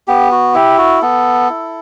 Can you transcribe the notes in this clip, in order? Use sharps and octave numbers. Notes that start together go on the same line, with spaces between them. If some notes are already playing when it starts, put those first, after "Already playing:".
B3 G4
F#4
E4 G4
F#4
B3 A4
E4